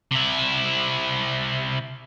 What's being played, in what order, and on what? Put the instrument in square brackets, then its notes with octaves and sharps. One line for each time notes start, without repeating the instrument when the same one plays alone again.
[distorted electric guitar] C3 E4